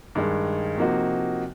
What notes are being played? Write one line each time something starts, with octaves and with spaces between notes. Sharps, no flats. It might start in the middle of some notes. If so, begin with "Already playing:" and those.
G2 D#3 G#3
C3 F3 A#3 D#4 F#4